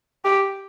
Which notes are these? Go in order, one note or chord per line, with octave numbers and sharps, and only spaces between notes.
G4